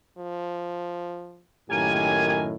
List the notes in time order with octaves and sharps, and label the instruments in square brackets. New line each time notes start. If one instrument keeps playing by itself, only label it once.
[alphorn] F3
[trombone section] F#2 A2 D#3 [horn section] A#3 G#5 [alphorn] G4